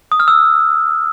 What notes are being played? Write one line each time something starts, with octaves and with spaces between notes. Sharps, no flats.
D#6
F6
E6